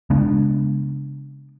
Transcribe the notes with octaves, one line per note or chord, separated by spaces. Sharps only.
C#3 G#3 B3 D4